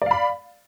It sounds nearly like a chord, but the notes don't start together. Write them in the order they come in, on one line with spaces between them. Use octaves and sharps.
D5 F5 B5